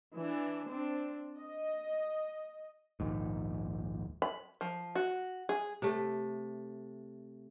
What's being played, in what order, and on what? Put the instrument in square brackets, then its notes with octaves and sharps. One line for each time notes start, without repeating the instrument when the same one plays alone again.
[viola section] E3 D4
C4 D4
D#5
[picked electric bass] A#1 D#2 G#2
[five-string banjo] B5
F3
F#4
G#4
[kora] C3 A3